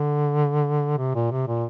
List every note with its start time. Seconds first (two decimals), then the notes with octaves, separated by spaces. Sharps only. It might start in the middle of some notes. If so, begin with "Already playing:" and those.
Already playing: D3
0.98 C3
1.15 A#2
1.31 C3
1.48 A#2